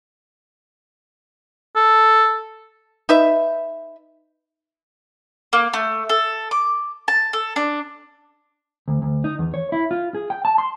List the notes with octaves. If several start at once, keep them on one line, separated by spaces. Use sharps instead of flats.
A4
D#4 B4 E5
A#3
A3
A4
D6
A5
A4
D4
D2
D2
D#4
E2
C#5
E4
F4
G#4
G5
A5
C6